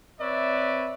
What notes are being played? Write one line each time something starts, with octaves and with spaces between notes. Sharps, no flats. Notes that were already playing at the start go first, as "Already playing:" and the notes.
C4 B4 C#5 D5 E5